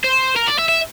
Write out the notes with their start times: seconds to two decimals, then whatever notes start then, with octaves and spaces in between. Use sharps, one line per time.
0.04 C5
0.36 A#4
0.48 D5
0.59 E5
0.69 E5